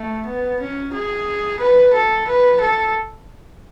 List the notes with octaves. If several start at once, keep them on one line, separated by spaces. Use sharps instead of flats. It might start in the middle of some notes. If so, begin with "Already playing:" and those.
Already playing: A3
B3
C#4
G#4
B4
A4
B4
A4